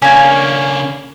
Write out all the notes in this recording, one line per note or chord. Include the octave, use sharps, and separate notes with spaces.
C#3 A#3 C#4 D4 G#5